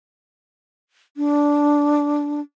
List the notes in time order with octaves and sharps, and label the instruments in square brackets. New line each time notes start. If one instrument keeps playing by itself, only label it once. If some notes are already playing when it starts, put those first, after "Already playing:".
[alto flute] D4